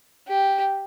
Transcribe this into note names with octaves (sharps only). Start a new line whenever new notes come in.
G4